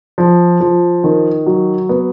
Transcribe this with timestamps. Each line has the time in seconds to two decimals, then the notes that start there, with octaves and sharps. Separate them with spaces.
0.18 F3
0.61 F3
1.04 D#3
1.47 F#3
1.89 B3